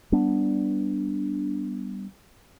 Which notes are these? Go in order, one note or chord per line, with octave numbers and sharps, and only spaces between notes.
G3 B3 D4